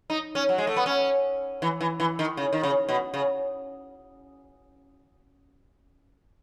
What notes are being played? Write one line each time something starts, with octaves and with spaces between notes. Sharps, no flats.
D#4
C#4
F#3
G#3
A3
B3
C#4
E3
E3
E3
D#3
C#3
D#3
C#3
B2
C#3